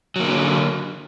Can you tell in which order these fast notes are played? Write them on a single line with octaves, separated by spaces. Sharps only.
F#3 A#3 D3